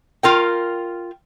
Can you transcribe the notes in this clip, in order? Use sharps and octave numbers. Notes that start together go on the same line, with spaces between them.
F4 A#4 G5